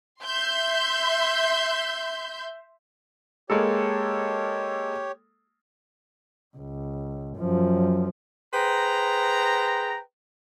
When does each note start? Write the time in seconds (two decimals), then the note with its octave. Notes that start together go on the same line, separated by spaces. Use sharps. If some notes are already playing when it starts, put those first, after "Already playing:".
0.24 E5 C6 G6
3.50 G#3 A#3 G4 A4 C#5
6.57 C#2
7.38 F#2 F3
8.54 G#4 B4 C5 G5 A#5